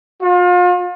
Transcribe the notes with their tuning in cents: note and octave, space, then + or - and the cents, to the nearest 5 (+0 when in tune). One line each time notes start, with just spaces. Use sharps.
F4 +35